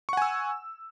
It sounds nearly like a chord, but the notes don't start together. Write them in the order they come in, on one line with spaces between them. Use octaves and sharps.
C#6 F#5 G#5 E6